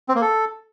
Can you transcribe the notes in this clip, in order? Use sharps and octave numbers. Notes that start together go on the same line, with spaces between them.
C4
A#3
A4